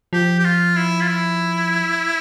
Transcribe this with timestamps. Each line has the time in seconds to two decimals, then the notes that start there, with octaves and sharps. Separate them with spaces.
0.13 F3 G4
0.39 G4
0.45 F4
0.76 E4
1.01 F4
1.07 E4